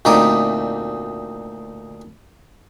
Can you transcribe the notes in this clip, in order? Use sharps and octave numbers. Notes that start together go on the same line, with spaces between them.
D2 A#2 C4 D#4 D6 D#6